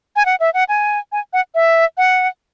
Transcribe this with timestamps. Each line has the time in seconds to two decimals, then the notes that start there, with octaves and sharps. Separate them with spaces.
0.16 G#5
0.26 F#5
0.40 E5
0.54 F#5
0.69 G#5
1.12 G#5
1.33 F#5
1.55 E5
1.97 F#5